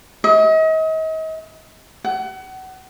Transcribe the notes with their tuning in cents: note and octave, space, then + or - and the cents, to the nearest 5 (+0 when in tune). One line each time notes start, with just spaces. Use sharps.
D#5 +40
F#5 +30